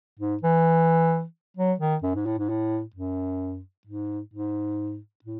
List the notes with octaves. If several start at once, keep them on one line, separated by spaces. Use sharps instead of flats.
G#2
E3
F#3
D#3
F#2
G#2
A2
G#2
A2
F#2
G#2
G#2
A2